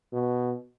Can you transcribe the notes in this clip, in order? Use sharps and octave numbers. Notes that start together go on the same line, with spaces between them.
B2